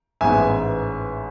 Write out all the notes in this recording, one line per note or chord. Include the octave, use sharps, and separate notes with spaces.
A1 G#2 G#3 B3 E5 G#5